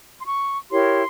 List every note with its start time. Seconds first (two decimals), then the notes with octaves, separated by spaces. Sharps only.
0.19 C6
0.25 C#6
0.71 E4 G4 A#4 C#5 C6